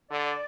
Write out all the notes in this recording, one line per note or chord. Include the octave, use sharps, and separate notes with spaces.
D3 D5